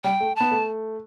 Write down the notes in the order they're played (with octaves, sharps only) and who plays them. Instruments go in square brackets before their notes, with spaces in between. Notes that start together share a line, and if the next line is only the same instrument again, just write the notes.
[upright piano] G3 [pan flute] G5
[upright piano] A3
[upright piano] B3 [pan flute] A5
[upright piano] A3